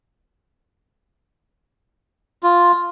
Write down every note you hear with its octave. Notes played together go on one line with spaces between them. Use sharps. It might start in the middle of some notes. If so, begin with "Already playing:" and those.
F4